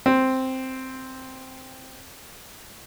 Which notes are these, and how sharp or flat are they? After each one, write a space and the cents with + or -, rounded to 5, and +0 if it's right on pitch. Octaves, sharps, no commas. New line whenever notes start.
C4 +0